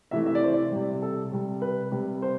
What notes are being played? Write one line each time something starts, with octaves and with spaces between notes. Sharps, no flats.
C3 E3 A3 E5
E5
D5
C5
D5
C3 G3
A4
C3 G3
B4
C3 G3
C5